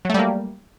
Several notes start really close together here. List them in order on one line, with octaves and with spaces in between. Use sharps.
F#3 A3 G3 A#3